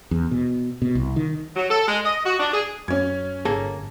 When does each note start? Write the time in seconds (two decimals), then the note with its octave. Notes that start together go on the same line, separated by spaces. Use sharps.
0.11 E2
0.31 B2
0.82 B2
0.95 C2
1.16 D#3
1.56 F#3
1.70 A4
1.87 G#3
2.04 D#5
2.25 F#4
2.39 D4
2.52 G#4
2.88 F#2 C#4 G#6
3.45 G1 A#3 G#4 A4